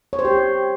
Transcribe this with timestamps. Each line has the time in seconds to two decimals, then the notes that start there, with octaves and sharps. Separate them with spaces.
0.13 C#5
0.19 C5
0.25 G4